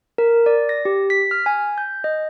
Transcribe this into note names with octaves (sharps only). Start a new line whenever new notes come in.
A#4
D5
A#6
G4
B6
F6
G#5
G6
D#5